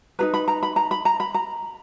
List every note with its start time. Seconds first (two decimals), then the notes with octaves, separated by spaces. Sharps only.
0.19 D#4 G#4 B4 A#5
0.34 B5
0.48 A#5
0.63 B5
0.76 A#5
0.91 B5
1.05 A#5
1.20 B5
1.34 A#5